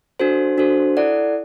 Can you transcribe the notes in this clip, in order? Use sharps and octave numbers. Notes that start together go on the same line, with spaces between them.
D4 F#4 A4 C5
D4 F#4 A4 C5
E4 A4 D5 F#5